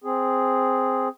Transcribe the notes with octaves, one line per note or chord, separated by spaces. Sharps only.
C4 G#4